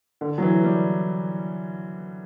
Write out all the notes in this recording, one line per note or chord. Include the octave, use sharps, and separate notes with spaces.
D3
F#3
E3
G3